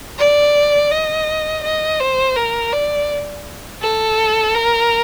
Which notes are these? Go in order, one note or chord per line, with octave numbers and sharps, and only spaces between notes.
D5
D#5
D#5
C5
A#4
D5
A4
A#4